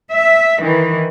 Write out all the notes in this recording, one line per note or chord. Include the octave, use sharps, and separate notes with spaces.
E5
D#3 E3